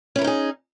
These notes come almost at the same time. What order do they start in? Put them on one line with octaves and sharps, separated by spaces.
C#4 E4 A#4 D#4 G#4